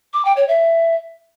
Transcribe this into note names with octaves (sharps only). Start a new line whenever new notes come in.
D6
G5
C#5
E5